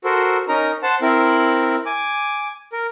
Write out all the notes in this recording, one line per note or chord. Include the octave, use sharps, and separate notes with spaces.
F#4 A4 A#4 C5
C#4 D#4 A#4 A#5
C5 F#5 A5
C4 E4 A#4
G#5 D6
A#4